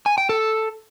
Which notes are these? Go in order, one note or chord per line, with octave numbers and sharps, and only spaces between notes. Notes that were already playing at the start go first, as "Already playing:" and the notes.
G#5
G5
A4